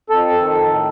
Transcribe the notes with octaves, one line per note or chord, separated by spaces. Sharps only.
F2 A4
D#3
A2